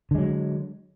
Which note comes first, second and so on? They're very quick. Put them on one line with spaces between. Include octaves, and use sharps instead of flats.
D3 G#3 F#3